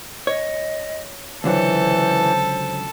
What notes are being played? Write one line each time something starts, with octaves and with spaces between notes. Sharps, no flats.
C#5 D#5
C#2 D3 E3 F#3 A4 C5